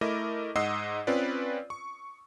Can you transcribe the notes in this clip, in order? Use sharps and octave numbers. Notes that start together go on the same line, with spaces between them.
A3 E4 A#4 D#5 D6
G#2 D#5 F#5 D#6 E6 C7
C4 C#4 F4 B4 D5
C#6